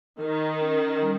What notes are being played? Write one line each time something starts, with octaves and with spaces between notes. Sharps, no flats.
D#3 A#4
C#4
G3